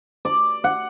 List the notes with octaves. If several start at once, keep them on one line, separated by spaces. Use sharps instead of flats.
D5
F#5